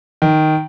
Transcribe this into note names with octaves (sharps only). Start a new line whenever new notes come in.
D#3